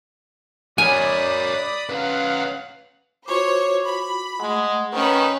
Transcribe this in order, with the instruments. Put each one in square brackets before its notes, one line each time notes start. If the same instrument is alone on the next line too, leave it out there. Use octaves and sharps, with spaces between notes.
[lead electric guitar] A#4 C#5 [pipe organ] D5 B5 D#6 [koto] G#5
[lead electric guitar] C#4 B4 [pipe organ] F5 F#5
[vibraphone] F4 F#4 D6 [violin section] C5 C#5
[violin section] B5
[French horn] G#3 [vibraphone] A3 F#5
[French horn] D#3 [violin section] C#4 B4